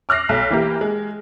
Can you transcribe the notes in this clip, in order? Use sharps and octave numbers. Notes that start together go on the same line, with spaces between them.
D6 F6 F#6 A#6 C7
B1
E3 A#3 G4
G#3